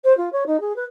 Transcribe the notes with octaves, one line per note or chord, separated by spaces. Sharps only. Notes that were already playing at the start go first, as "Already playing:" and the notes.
C5
F4
C#5
D#4
G#4
B4